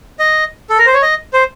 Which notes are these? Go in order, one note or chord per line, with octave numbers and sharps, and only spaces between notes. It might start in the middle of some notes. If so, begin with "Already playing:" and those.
D#5
A4
A#4
C5
C#5
D#5
C5